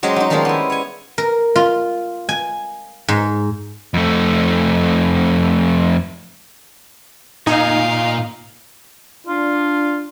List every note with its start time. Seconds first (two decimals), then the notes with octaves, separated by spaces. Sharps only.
0.03 F#3 G#3 C#4 G4 C5 D#5
0.16 F#3 D#4
0.30 D#3 F3 G3 G#3 A#3 D#4
0.45 B3 E4
0.70 C#5 G#5
1.18 A#4
1.56 F4
2.29 G#5
3.08 G#2
3.94 F2 A3
7.47 A#2 D#4 F5 G#5
9.27 D4 F4